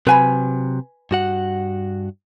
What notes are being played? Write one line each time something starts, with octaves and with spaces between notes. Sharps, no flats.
C3 F#3 B4 G#5 B5
G2 F#4 F#5